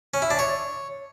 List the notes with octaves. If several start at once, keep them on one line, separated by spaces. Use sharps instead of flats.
C#4
E4
D4
C#5